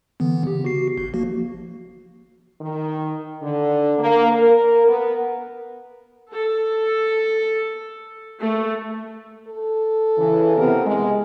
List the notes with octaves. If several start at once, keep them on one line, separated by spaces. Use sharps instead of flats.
D3 E3 B3
C#3 G4
F#4 C7
G1
F3 A#3 F#4
D#3
D3
A#3
A#4
B3
A4
A3
A4
C#3 E3
C3 B3 A#4
G#3